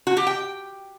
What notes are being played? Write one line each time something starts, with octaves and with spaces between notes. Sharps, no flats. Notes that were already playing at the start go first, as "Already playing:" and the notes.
F#4
G4
G5